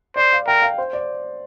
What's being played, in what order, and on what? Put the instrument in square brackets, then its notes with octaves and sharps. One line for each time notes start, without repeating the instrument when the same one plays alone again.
[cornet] C5 [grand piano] D5
[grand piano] F5
[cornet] A#4 [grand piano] G5
[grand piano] F5
C5
D5